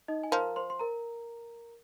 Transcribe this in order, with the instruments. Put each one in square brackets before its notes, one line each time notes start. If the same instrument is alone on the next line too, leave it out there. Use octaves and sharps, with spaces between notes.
[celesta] D#4 D#5
G#5
[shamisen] F3 [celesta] A#4 A#5
[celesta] C5 C6
C6
A#4 A#5